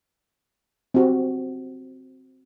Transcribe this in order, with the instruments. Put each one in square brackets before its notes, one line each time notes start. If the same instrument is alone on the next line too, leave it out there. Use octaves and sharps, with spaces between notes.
[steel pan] C4 F#4 G4